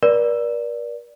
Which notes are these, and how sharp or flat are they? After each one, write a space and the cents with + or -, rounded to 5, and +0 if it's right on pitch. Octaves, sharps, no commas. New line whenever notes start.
A#4 +45 D5 +0